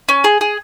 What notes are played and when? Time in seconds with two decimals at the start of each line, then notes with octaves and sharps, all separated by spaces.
0.09 C#4
0.24 G#4
0.41 G#4